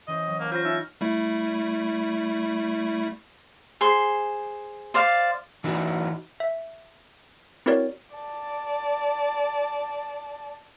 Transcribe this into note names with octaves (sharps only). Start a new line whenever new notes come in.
E3 C#4 C5 D#5
F#3
A#3 C#5 A5 A#5
F4 C5 C#6 F6 A#6
D#4 E5
G3 A3 E4
G#4 C5 C6
C5 D5 F5
E3 D#4 F#4
E5
C4 E4 F#4 A#4 C#5 D5
D5 A5